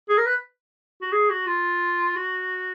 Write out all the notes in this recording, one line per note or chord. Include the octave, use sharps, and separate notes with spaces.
G#4
A#4
B4
F#4
G#4
F#4
F4
F#4